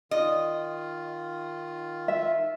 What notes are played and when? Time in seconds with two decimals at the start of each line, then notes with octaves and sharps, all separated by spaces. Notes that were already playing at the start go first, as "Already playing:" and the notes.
0.11 D#3 F4 D#5
2.08 E5